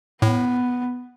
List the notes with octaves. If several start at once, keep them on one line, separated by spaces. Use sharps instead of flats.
A2 B3